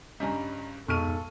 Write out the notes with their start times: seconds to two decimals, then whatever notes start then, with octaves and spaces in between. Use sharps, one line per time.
0.20 G2 C#3 G3 D#5 G#5 A#5
0.88 B1 F2 G#2 A4 C#6 F6 D#7